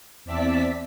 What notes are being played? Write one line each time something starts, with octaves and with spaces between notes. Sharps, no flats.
E2 C4 D5 E5 A5 B6